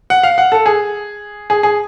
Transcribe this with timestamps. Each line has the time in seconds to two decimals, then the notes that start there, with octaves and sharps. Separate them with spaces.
0.10 F#5
0.23 F5
0.38 F#5
0.52 A4
0.66 G#4
1.50 G#4
1.63 G#4